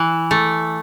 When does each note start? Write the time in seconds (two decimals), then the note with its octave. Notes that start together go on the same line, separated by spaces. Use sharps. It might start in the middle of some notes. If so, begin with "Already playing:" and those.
Already playing: E3
0.31 A3